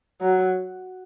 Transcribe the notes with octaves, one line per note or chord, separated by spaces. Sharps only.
F#3